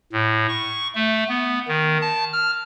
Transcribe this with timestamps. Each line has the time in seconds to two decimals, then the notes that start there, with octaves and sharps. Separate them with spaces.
0.13 A2
0.48 C#6
0.95 A3
1.29 B3
1.68 D#3
2.01 A5
2.33 F6